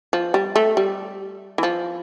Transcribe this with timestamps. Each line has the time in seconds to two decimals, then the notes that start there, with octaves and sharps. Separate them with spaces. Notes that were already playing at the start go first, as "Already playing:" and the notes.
0.13 F3
0.34 G3
0.56 A3
0.77 G3
1.58 E3
1.63 F3